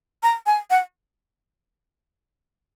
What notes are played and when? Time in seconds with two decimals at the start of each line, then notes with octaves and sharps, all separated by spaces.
0.23 A#5
0.46 G#5
0.70 F#5